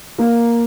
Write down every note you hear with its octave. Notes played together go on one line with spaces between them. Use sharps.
A#3